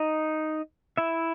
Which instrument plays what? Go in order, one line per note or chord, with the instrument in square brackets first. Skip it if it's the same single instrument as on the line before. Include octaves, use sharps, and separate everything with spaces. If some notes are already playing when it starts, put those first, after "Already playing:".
Already playing: [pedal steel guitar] D#4 D#5
E4 E5